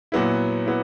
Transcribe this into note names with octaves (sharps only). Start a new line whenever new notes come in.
A#2 F#3 B3 E4
B3 E4